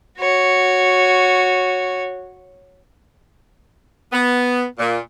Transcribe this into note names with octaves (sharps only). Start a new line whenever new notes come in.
F#4 C#5
B3
A#2